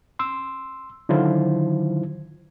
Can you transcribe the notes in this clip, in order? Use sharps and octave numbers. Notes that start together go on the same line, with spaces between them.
C6 E6
D3 D#3 F#3 E4 F4 C5